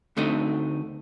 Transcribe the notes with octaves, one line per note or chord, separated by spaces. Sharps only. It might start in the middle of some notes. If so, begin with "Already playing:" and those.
D2 D3 A3 C4 D#4